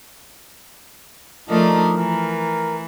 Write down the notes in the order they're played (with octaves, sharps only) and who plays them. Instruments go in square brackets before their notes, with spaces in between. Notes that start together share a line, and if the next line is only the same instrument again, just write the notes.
[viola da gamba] F3 A3 A#4 [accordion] D4 D#4
[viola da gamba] E3 [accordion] A#4